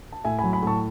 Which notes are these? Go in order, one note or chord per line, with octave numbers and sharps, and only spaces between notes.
A5
A2 E5 G#5
F#3 G#5 B5
G#5 B5
A2 A5 C#6